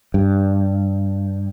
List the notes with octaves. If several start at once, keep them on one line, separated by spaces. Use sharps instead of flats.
G2